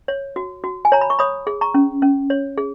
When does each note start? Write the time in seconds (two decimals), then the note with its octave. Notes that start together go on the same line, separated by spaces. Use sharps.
0.08 C#5
0.36 F#4
0.64 F#4
0.85 G#5
0.92 C#5 A#5
1.01 B5
1.10 C#6
1.19 C#5 B5 D#6
1.47 G#4
1.61 A#5 C#6
1.74 C#4
2.02 C#4
2.30 C#5
2.58 G#4